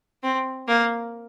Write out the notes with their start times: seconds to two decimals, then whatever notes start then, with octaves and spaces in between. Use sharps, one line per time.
0.23 C4
0.68 A#3